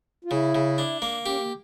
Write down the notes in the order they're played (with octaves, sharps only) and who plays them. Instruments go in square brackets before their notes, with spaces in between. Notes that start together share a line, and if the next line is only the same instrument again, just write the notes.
[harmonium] F4
[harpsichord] C#3 [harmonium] E4
[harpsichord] C#3
D4
A#3
[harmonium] C#4 [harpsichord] G4
[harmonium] A#3